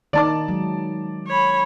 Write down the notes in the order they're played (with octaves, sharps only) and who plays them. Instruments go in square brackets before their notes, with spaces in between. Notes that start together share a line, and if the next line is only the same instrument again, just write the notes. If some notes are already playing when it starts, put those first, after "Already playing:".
[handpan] D#3 A#3 D#4 [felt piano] D5 A5 D6
[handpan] F#3 G#3
[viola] C#5 B5